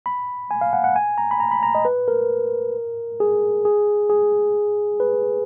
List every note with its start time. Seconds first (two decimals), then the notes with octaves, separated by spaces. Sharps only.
0.06 B5
0.51 G#5
0.61 F5
0.73 F#5
0.84 F#5
0.96 G#5
1.18 A#5
1.31 B5
1.40 A#5
1.51 B5
1.63 A#5
1.75 D#5
1.85 B4
2.08 A#4
3.20 G#4
3.65 G#4
4.10 G#4
5.00 B4